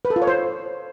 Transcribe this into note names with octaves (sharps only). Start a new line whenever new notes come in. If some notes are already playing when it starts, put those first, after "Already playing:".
B4
A4
F4
C#5
C5